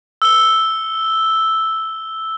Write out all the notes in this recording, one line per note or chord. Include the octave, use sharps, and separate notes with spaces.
E6 G7